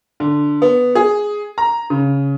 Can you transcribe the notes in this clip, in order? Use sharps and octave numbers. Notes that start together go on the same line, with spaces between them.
D3
B3
G#4
A#5
C#3